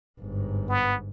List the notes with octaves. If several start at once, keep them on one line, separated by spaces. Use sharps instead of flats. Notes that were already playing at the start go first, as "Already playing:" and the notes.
G1 G#2
B3